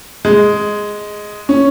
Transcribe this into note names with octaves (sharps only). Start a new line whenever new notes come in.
G#3
C#4